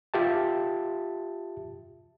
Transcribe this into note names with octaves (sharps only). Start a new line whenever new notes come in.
F4 G4 E5 A5